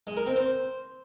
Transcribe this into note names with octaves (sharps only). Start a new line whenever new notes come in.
G#3
A#4
C4
C5